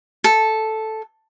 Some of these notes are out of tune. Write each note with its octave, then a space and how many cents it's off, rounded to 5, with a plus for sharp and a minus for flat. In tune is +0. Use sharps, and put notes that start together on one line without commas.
A4 -5